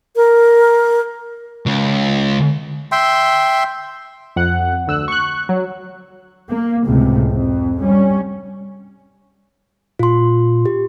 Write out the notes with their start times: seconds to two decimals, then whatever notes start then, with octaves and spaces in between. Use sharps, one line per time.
0.16 A#4
1.66 C#2
2.92 E5 G5 C6
4.36 F2 F#5 F#6
4.87 D2 E6 F#6
5.08 C#6 F#6
5.49 F#3
6.51 A#3
6.86 C#2 A2 C3
7.29 F2
7.80 G3 C#4
9.99 A#2 F4 C6
10.66 G4